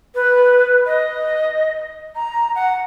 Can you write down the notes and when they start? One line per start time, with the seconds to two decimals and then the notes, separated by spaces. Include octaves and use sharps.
0.15 B4
0.86 D#5
2.16 A#5
2.55 F#5